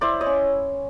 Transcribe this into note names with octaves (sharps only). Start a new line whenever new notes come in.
E4 C5 D5
C#5 D#5
C#4